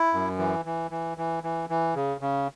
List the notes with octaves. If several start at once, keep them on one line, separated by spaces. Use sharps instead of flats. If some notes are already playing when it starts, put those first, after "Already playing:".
Already playing: E4
F#2
E3
E3
E3
E3
E3
E3
C#3
C#3